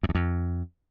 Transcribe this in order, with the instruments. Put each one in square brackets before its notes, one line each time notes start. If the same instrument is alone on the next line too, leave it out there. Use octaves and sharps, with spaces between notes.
[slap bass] F#2
E2
F2